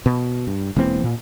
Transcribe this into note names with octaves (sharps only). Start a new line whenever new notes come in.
B2
G2
E1 E3 A#3 C4
A#2